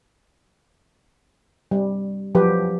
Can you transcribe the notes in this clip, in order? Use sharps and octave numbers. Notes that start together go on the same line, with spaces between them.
G3
F3 F#3 G4 B4